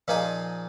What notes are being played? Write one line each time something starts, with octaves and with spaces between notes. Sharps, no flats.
A#2 F3 A#3 D#4 G#4